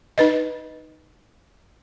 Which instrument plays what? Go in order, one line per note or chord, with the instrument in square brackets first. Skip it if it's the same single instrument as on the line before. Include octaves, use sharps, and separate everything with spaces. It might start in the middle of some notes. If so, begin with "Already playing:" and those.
[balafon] D#4 B4 D#5